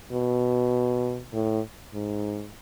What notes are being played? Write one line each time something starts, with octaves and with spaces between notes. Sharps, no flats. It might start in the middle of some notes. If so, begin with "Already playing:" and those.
B2
A2
G#2